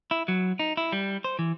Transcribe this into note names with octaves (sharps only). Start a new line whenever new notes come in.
E4
F#3
D#4
E4
G3
C5
E3